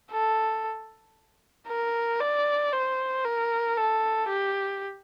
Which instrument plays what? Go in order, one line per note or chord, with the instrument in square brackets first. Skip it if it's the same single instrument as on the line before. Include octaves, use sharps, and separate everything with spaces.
[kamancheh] A4
A#4
D5
C5
A#4
A4
G4